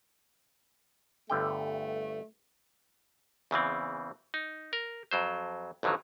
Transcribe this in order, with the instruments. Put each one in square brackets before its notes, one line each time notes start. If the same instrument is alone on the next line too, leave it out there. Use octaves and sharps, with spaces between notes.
[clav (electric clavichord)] G1 D3 G5 [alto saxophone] A3
[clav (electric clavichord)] E2 C#3 E3 C4
D#4
A#4
F2 F#3 C5
A1 F2 D3 D#3 F#3